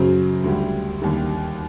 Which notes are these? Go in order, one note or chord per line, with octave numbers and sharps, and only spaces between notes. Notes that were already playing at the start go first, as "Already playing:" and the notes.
Already playing: F#2 C#3 F#3 C5
D2 D3 G3
D#2 D3 G3